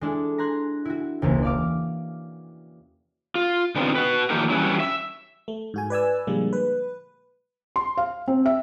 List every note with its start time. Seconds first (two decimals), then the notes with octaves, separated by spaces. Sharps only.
0.01 G#3 D4 E4 A4
0.38 A#5 C6 F#6 G#6
0.85 E4 F#4
1.22 E1 C#2 A#3
1.42 D5 F5 D6
3.35 F4
3.75 D3 B3 C4 D#4 F4
3.95 F#4 B4
4.30 D#3 F3 A#3 D#4 G4 A#4
4.50 E3 F#3 G3 C#4 E4
4.80 E5
5.48 A3
5.74 G#2 F#4 G#5
5.90 B4 D5 G#5 E6
6.27 A#2 D3 F3 G3 G#3 A#3
6.53 B4
7.76 C6
7.97 F5
8.28 C4
8.46 E5